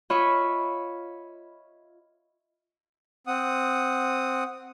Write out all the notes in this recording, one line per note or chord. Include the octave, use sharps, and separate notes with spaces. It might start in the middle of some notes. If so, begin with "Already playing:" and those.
F4 C#5 D#5 E5 B5 C#6
C4 F#5 D#6